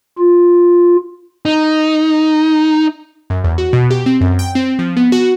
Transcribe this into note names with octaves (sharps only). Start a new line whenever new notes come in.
F4
D#4
F#2
E2
F#4
B2
G4
C4
F#2
G5
C4
F3
B3
F#4